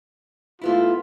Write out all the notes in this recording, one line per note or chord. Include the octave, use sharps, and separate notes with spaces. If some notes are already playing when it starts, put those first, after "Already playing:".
A3 B3 E4 F4